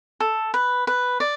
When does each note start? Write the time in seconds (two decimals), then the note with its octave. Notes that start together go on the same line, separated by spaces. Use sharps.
0.20 A4
0.54 B4
0.87 B4
1.20 D5